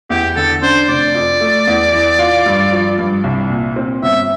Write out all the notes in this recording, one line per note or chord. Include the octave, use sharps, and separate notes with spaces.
E2 G4
D3 A4
D4 C5
F1 D5
F2
A3
E2
E3
F4
G2
F3
G2
C2
A#2
C4
G1 E5